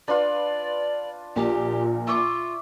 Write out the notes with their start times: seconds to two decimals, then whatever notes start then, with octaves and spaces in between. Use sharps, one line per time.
0.08 D4 F4 B4 D5
1.36 A#1 A#2 G4
2.07 F4 E5 C#6 D6